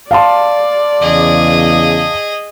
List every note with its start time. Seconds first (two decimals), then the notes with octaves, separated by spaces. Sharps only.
0.11 D5 F5 A5 C6
1.02 E2 C#3 G#4 D#5